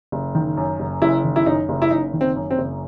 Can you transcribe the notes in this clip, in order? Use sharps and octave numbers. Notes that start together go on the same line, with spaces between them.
F#1
D#3
F#2
F#1
F#1 E4
D#3
E4
F#2 D#4
F#1
E4
F#1 D#4
D#3
C4
F#2
C4
F#1